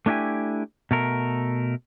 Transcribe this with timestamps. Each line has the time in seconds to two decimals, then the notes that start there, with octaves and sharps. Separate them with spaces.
0.06 A3 D4 E4 G4 G#5
0.91 B2 A3 A#4